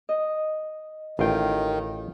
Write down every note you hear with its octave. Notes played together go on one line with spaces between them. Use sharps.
D#5
A1 D#3 F4 G5